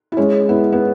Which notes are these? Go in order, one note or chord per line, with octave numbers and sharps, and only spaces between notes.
E4
G#3 C#4
B3 E4
B3